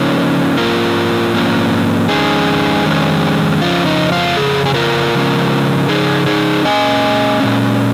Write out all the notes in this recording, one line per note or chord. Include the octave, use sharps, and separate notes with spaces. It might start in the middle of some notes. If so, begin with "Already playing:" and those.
Already playing: C#3 F3 A#3 C#4 D#4
G#2 F3 A#3 C#4 F4 A#4
G#2 F3 A#3 C#4
F2 D#3 G#3 C#4 D#4 G#4
F2 D#3 G#3 C#4
F2 C#3 F3 C#4 F4
D#4
F4
F2 C#3 G#4
G#4
F4 A#4
C#3 F3 G#3 C#4
C#3 F3 D#4 G#4
D#4 G#4
A#2 G#3 C#4 D#5 G#5
A#2 G#3 C#4